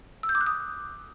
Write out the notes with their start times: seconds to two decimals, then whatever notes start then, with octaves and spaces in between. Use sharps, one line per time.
0.23 E6
0.29 G6
0.35 D6
0.41 F#6
0.47 D#6